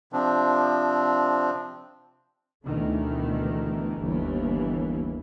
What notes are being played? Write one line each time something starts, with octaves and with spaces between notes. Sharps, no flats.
C3 F3 C4 D4
D2 B2 D#3 E3 A3
G1 D#2 E3